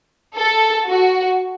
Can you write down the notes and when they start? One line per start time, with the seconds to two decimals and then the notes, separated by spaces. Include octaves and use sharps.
0.36 A4
0.89 F#4